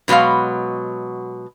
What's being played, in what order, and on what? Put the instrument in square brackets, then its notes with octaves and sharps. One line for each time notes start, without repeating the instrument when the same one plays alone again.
[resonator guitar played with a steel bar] G2 B2 F#3 G#3 F5